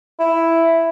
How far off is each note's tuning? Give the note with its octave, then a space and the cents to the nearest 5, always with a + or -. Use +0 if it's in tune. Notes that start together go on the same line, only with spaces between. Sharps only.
E4 +5